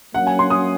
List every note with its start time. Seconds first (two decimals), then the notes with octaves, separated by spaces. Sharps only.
0.14 F#3 A#3 C#4 F#5
0.27 G#5
0.39 C6
0.50 D#6